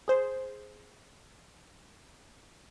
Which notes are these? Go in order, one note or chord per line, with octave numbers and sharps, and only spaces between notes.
G#4 C5